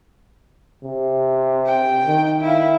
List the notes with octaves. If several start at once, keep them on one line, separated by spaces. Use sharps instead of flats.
C3
G5
D#3
E4 F5